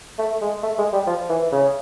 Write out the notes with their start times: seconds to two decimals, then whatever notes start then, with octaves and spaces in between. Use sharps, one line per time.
0.19 A3
0.41 G#3
0.63 A3
0.78 G#3
0.93 G3
1.07 F3
1.30 E3
1.52 C#3